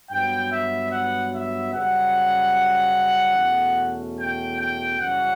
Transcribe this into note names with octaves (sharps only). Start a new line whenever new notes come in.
G2 F#3 B3 G5
E5
F#5
E5
F#2 C#3 G3 F#5
E2 B2 A3 C#4
G5
G5
F#2 C#3 E3 G3 C#4 F#5